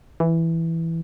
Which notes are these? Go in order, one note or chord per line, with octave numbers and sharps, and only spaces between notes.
E3